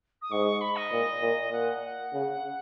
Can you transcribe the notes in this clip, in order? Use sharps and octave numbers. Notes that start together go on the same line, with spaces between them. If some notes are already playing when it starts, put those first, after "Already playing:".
D#6
G#2 C#6
B5
D#5
A#2
A#2
A#2 F#5
F#5
C#3